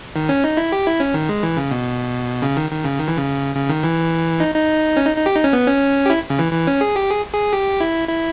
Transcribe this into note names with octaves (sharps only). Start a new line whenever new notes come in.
D#3
C#4
D#4
E4
G4
E4
C#4
D#3
G#3
E3
C#3
B2
C#3
D#3
D#3
C#3
D#3
E3
C#3
C#3
D#3
E3
D#4
D#4
C#4
D#4
D#4
G4
D#4
C#4
B3
C#4
G4
E4
C#3
E3
E3
C#4
G#4
G4
G#4
G#4
G4
E4
E4